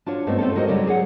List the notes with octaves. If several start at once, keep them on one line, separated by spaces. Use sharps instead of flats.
D4 F4 F#4 C#5
G2 A3 B3 C4 D#4
A3 C4 C#4 F4 A4
F#3 G#3 A#3 F#4 C5 D#5
C#3 F#3 G3 C#4 A4 D5
G#4 C#5 F#5